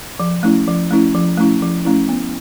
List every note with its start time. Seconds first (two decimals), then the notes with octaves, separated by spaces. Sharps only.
0.20 F3
0.43 A3 C#4 E4
0.67 F3
0.91 A3 C#4 E4
1.15 F3
1.38 A3 C#4 E4
1.62 F3
1.85 A3 C#4 E4
2.09 B3